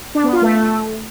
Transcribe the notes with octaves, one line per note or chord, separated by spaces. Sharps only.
D4
B3
F4
A3